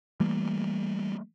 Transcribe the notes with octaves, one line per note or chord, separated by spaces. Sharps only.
E3 G3 A3 A#3